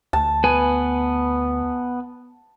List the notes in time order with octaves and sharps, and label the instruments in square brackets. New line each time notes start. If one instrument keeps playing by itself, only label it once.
[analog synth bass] D2 [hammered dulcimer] A5
[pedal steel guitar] B3 B4 G#5